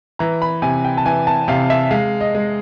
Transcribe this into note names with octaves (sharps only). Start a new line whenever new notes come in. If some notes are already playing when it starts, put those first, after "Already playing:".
E3 A#5
B5
C3 G#5
G5
A5
E3 G#5
A5
C3 F5
E5
G#3 F5
D#5
G#3